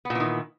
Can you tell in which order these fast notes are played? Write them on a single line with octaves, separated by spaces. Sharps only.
B3 A#2 E3 D#3